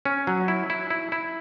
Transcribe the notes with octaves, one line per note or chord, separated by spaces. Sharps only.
C#4
F#3
E4
E4
E4
E4